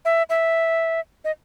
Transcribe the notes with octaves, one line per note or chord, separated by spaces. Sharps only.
E5
E5
D#5